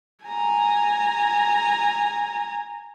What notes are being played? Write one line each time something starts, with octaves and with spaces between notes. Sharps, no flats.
G#5 A#5